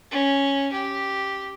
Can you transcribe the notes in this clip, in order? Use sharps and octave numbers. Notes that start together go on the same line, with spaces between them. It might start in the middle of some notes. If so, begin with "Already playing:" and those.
C#4
G4